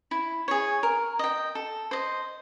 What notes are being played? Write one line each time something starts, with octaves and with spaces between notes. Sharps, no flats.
E4
G#4 C#5
A#4
D#5 G5
A4
C5 D#5